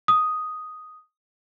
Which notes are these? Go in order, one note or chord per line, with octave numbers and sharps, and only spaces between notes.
D#6